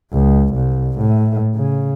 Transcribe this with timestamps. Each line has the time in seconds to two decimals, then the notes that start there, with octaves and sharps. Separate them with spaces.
0.13 C#2
0.55 C2
0.99 A2
1.55 C#3